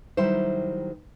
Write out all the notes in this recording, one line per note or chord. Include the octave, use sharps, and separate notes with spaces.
D#3 F#3 G3 E4 G4 C5